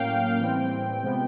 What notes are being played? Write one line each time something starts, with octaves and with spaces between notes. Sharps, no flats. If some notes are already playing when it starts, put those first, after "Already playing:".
Already playing: A2 F#3 A#3 C#4 F5 G5
A2 E3 G3 C4 G5
C3 F3 G#3 B3